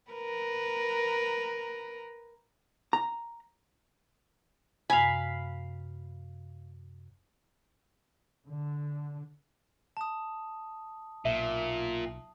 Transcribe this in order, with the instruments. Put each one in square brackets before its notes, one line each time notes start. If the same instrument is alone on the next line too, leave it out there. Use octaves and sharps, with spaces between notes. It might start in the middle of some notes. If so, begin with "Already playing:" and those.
[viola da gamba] A#4 B4
[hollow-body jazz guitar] A#5
[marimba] F#2 C3 [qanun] F5 B5 [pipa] G#5
[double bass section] D3
[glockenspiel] A5 D#6
[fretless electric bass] B1 [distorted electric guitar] A#2 [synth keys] E5